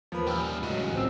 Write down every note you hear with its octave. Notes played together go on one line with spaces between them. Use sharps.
D#2 F3 A#3 B4
G3 C#4 G5 E6 F6
A2 C#3 F#3 G#3 F#4
A1
C#2 C4 E6